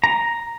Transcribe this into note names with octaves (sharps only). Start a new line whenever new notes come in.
A#5